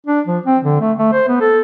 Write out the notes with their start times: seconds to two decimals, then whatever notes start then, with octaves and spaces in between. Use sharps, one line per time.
0.06 D4
0.27 F3
0.46 C4
0.63 D3
0.81 A3
0.98 A3
1.13 C5
1.28 B3
1.41 A4